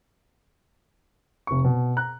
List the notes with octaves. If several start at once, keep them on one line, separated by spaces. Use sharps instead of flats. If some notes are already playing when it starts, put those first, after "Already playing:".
F1 C#6
B2
A#5 F#6